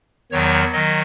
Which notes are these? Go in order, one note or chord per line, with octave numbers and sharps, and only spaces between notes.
E2 D#3 F#3 C#5
D#3 F#3 D#5